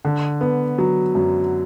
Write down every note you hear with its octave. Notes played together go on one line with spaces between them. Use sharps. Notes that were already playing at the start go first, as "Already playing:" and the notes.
D3
B3
F#3
F#2